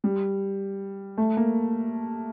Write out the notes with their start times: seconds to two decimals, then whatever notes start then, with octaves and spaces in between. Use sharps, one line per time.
0.04 G3
1.18 A3
1.37 A#3